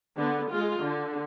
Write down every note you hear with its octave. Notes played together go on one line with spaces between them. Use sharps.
D3 B3
G#3 F4
D3